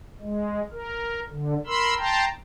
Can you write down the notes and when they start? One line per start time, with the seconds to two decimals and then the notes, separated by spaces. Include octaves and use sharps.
0.20 G#3
0.72 A#4
1.29 D3
1.66 A#4 B5 C6 E6
1.98 G5 A5 A#5 C6